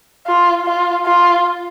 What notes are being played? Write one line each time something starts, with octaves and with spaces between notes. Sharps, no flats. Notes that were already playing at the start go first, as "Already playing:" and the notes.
F4
F4
F4